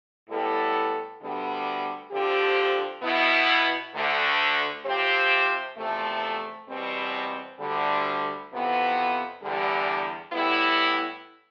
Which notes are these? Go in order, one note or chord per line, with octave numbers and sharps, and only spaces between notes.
A2 G3 B3 E4 A4
D2 D3 G3 B3
D3 F3 C4 G4
B2 B3 E4
D2 D3 A3
C3 F3 C4 G4 C5
E2 C3 F3 A3
E2 B2 G3 C4
D2 D3 G3
F2 C3 E3 B3
E2 D3 G3
A2 G3 B3 E4